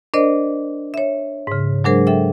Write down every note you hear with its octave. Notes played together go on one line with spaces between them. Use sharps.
D4 A#4 C5 D5 D#5
C#5 E5
G#2 C#3
F#3 G#3 D4 G#4 A#4 C5
A4 E5 G5